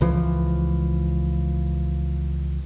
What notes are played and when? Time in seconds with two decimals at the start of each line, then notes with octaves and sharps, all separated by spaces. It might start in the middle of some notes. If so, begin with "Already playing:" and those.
0.01 C#2 E3 F3